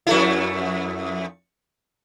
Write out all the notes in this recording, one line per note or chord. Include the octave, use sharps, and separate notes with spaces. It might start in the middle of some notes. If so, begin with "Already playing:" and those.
F2 A3 E4